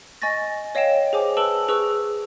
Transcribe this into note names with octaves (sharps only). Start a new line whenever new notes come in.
D#5 G#5 C#6 A6 A#6
C#5 D#5 F5 G5 E7
G#4 C5 G#5 D6
B4 A5 E6 D7 F#7 G7
G#4 B4 C#6 E6